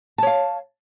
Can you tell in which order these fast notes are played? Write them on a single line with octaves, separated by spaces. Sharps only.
A5 C#5 F5